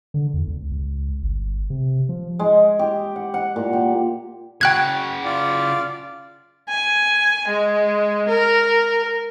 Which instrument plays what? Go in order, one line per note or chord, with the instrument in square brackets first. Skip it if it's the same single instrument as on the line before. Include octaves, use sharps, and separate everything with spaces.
[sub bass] D3
E2
C#2
C#2
G1
C3
F3
[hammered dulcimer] G#3
G4
F#5
F#5
A#2
G4
[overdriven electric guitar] C#3 F#4 [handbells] G5 F#6 G#6
[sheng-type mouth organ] F4 D5
[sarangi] G#5
G#3
A#4